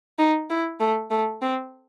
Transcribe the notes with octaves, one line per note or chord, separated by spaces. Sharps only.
D#4
E4
A3
A3
C4